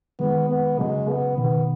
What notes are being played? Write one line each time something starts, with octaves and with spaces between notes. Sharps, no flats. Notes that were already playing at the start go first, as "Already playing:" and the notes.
D#3 G#3 B3
B3
C#3 F#3 G#3
B3
B2 D#3 B3